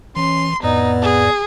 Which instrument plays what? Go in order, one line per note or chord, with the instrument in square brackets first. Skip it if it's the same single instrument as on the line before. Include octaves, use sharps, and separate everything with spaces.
[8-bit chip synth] E3 [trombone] C#4 [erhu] C6
[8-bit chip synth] F2 A2 D5 [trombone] B3 [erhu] D#4
[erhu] G#4